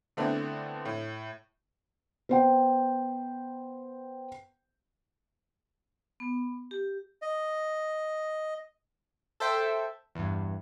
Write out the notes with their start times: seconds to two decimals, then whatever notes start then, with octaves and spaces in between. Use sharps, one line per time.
0.17 D3 A3 B3 C4 D4 E4
0.85 A2
2.29 B3 C5 G5
6.20 B3
6.71 G4
7.22 D#5
9.40 A4 C5 E5 G5
10.15 E2 G2